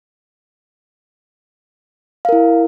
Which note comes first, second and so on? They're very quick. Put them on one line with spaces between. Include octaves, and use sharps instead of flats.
F5 A#4 E4